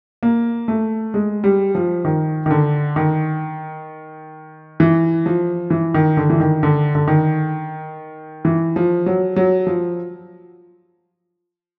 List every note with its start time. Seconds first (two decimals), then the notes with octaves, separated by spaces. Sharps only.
0.23 A#3
0.68 A3
1.14 G#3
1.44 G3
1.75 F3
2.05 D#3
2.46 D#3
2.51 D3
2.96 D#3
4.80 E3
5.26 F3
5.70 E3
5.94 D#3
6.17 D3
6.30 E3
6.40 D#3
6.63 D3
6.95 D3
7.08 D#3
8.45 E3
8.76 F3
9.06 F#3
9.36 F#3
9.67 F3